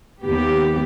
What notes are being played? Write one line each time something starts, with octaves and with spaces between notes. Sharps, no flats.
D#2 B3 G4